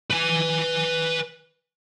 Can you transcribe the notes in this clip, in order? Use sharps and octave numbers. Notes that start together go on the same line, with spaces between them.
B4 G#5